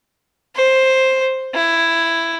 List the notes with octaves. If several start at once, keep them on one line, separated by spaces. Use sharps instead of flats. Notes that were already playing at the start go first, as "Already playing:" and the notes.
C5
E4